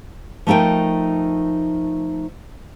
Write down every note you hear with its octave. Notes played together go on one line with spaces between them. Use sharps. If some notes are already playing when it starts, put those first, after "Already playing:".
F3 A3 D#4 A#4 G5